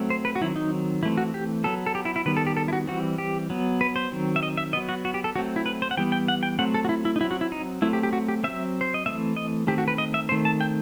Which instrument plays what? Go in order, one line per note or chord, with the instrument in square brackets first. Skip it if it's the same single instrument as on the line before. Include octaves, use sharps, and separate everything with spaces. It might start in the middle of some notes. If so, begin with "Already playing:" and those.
Already playing: [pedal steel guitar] F#3 A3 C4
C5
B4
F#4
D#3 F#3 C4 E4
D#4
E3 E4
A3 C4
F#4
G4
F#3 B3 A4
A4
G4
E4
E4
D#3 G3 B3 B4
A4
G4
A4
E4
F#4
E3 G3 C4 F#4
G4
F#3 B3
B4
C5
D#3 F#3 C4
E5
D#5
E5
F#3 B3 D#5
F#4
F#4
G4
A4
F#3 A3 C4 F#4
E4
B4
C5
F#5
E3 G3 B3 G5
G5
F#5
G5
F#3 A3 C4 F#5
A4
F#4
E4
E4
D#4
F#3 E4
C4
F#4
E4
D#4
F#3 A3 C4 E4
G4
G4
F#4
G4
F#3 C4 E5
C5
D#5
E3 A3 C4 E5
D#5
D#3 A3 C4 G4
F#4
B4
D#5
E5
D#3 A3 C4 C5
A5
G5